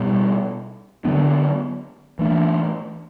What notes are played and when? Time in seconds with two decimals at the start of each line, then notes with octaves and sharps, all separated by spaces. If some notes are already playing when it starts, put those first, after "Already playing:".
Already playing: B2 G3 B3
1.05 D3 F#3 B3 D4
2.19 E3 A3 D4